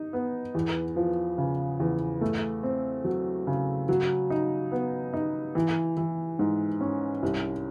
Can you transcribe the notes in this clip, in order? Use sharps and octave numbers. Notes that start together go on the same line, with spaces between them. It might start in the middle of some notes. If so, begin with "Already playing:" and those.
Already playing: D#4
B3
E2
F3
C#3
E2
A3
C4
F#3
C#3
F#3
D#4
B3
D#4
E3
E3
G#2
C#4
C2